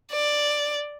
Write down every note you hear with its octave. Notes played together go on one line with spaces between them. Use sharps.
D5